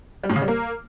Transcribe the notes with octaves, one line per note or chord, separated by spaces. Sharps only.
G3
A2
C#3
G3
A#3